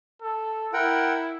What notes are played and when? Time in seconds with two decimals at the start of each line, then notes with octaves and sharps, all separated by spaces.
0.22 A4
0.73 E4 A#4 F#5 G5